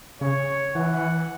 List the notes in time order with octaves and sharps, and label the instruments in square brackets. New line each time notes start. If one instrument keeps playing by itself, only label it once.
[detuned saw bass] C#3 [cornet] C#5
[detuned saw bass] E3 [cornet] F#5